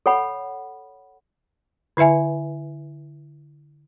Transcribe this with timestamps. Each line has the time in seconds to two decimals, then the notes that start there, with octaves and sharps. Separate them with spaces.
0.06 A4 C#5 F#5 B5
1.97 D3 E4 B4 E5 G#5